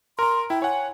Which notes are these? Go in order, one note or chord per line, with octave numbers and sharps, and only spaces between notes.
A#4 A#5 C6
E4 G5
C#5 F#5 G#5